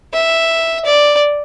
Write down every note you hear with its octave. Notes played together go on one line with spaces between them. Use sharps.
E5
D5